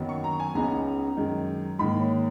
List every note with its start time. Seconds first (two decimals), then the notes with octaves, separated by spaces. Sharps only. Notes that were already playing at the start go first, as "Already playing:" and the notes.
Already playing: F#2 D#3 F#3 B3
0.09 C#6
0.24 A#5
0.40 G#5
0.55 C#2 C#3 G#3 B3 D#4 A#5
1.17 F#2 D#3 G#3
1.79 G#2 D#3 A#3 B5
1.99 C#5